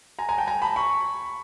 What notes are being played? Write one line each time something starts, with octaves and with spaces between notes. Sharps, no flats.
G#5 A#5
G#5 A#5
G5 A5
G#5 A#5
A5 B5
B5 C#6